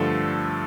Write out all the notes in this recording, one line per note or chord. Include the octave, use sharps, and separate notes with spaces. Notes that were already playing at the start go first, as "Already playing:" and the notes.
Already playing: G2 D3 F3 A3 A4